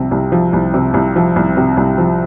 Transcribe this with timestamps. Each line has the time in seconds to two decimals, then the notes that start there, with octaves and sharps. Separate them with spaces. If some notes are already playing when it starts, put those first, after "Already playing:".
Already playing: C2 C3 F3
0.11 C2
0.32 F3
0.53 C2
0.74 C3
0.94 C2
1.16 F3
1.36 C2
1.57 C3
1.77 C2
1.98 F3